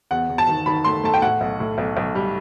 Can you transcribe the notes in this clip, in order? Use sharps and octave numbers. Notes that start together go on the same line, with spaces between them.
E2 F#5
E2
A5
D#3
D#3 B5
A3 C6
A3 A5
G5
A2 F#5
B1
A2
B1
B1
G3